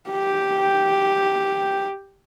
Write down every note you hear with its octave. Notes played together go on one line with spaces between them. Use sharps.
G4 G5